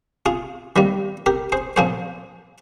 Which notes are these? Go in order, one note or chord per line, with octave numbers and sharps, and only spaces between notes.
F4 G#4
D#3 G3 A#3
G4 A#4
G#4 C5
A#2 F3 A#3 G#4 C5